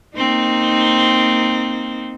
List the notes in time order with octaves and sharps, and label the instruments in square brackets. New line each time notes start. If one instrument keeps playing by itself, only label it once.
[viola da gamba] A#3 C4 D#4